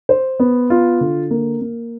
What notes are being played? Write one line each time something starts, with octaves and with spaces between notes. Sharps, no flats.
C5
B3
F4
D3
A#3
A#3